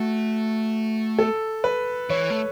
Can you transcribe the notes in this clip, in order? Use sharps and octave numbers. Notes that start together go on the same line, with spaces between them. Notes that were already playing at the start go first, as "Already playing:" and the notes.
Already playing: A3 F#4
A4
B4
E3 C#5
A3